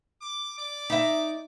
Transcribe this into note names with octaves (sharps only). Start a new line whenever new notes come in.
D6
D5 D6
D#4 E5